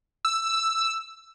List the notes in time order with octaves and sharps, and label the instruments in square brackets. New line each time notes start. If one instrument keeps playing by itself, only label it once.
[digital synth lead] E6